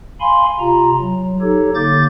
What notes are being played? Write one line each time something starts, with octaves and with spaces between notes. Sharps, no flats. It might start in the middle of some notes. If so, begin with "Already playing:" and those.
F5 G#5 B5 C6
C3 F4 A#5
F#3
D#4 G4 A4 C#5
D3 A#3 D6 G6 A6